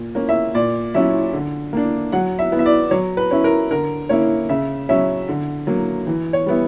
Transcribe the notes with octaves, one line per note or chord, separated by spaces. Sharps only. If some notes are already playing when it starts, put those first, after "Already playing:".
Already playing: A#2
A#3 C#4
E5
A#2 D5
F#3 C#4 E4 E5
D3
A#3 D4
F#3 F#5
E5
B3 E4
E5
D5
F#3 C#5
B4
C#4 E4
A#4
D3 A#4
A#3 C#4 E4 C#5
C#3 E5
F#3 C#4 E5
D3
F#3 A#3
E3
C#5
G3 B3 E4